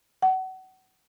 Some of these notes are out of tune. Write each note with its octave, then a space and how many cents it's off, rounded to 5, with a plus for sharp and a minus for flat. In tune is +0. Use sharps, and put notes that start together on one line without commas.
F#5 +30